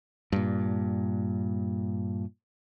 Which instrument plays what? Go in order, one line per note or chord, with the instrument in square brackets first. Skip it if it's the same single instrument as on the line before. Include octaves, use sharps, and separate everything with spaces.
[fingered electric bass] G2 A#2